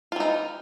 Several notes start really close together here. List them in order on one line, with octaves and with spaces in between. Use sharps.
F4 E3 D#4